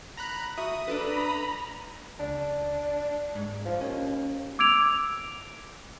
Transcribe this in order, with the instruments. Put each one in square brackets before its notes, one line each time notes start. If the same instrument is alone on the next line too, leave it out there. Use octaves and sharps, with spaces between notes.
[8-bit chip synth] A#5 B5 F#6
[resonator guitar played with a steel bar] F#4 E5 [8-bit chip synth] D#6
[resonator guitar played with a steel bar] D4 A4 B4 [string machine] A#5 B5
[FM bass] C#2 [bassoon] D4
[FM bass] G#2
[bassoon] F3
[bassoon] D#2 [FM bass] C#4
[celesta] D6 E6 G#6 D7 F7